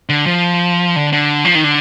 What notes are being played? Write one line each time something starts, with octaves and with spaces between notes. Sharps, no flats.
D3
F3
D3
D3
F3
D#3
D3